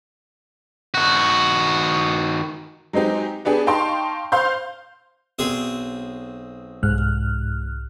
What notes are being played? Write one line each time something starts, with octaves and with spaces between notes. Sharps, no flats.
D#3 F#4
F#3 G#3 C4 D#4 G4
B3 D4 G4 G#4
D#4 F5 G5 A5 C6 C#6
C5 F5 C6 G6
B1 C4 G#4
C2 G#2 F6 F#6